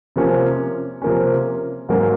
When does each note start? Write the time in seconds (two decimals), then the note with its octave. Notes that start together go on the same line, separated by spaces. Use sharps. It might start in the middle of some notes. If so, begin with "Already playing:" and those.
0.16 C3 F3 A#3 C#4
1.02 C3 F3 A#3 C#4
1.89 G#2 F#3 A#3 C#4